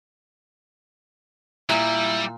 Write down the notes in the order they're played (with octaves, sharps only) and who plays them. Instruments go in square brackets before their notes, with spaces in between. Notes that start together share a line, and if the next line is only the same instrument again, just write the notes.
[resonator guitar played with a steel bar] A#2 [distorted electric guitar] G3 [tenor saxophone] E4